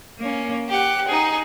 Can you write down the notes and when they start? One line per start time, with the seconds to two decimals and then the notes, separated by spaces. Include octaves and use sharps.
0.18 A#3 C#4
0.67 G4 F#5
1.07 D#4 G#4